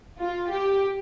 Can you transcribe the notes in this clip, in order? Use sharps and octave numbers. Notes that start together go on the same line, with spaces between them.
F4
G4